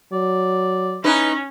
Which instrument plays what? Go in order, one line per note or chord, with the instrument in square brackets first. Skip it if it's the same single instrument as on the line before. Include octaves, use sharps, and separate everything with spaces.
[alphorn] F#3 [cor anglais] D5
[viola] C#4 [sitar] D#4 E4 B4